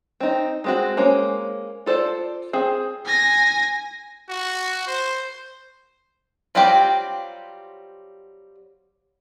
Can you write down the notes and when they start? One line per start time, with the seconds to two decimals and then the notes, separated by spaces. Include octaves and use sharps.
0.20 C4 D#4
0.64 G#3 C4 F#4
0.97 G#3 A#3 C#4 C5
1.86 F4 A4 C5 D5
2.53 C4 G#4
3.06 G#5 A#6
4.29 F#4
4.87 C5
6.55 F#3 G3 C4 F4 G4